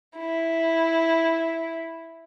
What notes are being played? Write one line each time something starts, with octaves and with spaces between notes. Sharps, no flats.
E4